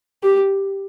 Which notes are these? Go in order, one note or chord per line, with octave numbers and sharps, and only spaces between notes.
G4